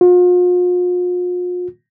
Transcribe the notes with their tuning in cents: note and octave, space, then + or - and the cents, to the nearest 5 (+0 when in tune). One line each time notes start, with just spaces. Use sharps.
F4 +40